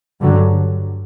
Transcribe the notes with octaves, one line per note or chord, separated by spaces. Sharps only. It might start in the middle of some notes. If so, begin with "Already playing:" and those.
G2 D3 F#3